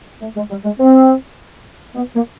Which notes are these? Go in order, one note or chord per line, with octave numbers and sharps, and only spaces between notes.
A3
G#3
G3
G#3
C4
B3
A#3